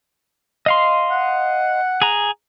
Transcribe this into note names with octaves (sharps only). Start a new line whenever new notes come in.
D#5 F5 C6
F#5
G#4 A#5